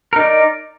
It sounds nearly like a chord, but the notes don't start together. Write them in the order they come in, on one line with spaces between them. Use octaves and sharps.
A#4 D#4 D5